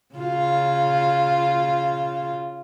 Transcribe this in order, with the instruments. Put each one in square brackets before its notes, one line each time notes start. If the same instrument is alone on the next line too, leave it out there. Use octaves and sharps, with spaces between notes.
[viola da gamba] C#3 F4